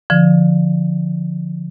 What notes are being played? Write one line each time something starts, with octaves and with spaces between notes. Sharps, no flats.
D3 F3